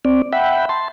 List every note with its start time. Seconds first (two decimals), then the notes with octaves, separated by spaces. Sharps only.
0.05 C4 D5
0.33 E5 F#5 G5 B5
0.69 A5 C6